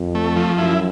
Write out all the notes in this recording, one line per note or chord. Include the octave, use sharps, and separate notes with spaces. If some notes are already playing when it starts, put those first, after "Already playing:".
Already playing: F2
A3
F3
F#2 E4